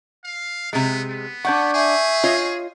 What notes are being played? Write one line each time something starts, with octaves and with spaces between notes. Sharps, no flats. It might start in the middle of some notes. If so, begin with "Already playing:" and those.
F5
C3 G#3 B3
B3
D4 D5 F#5 C#6 G6 G#6
G#4 E5 G#5 C#6 G6
F4 C#5 D#5